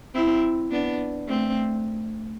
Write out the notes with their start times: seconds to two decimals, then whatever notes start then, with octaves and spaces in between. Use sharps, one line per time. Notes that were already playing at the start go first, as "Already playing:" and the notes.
0.15 C4 E4
0.71 B3 D4
1.28 A3 C4